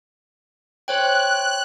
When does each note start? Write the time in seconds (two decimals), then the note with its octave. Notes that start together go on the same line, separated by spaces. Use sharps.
0.88 C5 C#5 G5 F#6